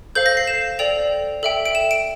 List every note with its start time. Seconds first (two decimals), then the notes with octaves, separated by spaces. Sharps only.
0.15 A4 C5 F5 G6
0.26 A#6
0.37 C7
0.47 E7
0.79 A4 D5 G5 F7
1.43 A4 E5 G5
1.66 D7
1.75 E7
1.91 D7